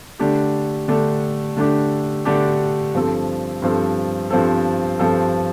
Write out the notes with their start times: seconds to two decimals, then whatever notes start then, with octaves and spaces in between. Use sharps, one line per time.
0.19 D3 A3 D4 G4
0.88 D3 A3 D4 G4
1.57 D3 A3 D4 G4
2.25 D3 A3 D4 G4
2.94 G2 F3 C4 A4
3.62 G2 F3 C4 A4
4.30 G2 F3 C4 A4
4.99 G2 F3 C4 A4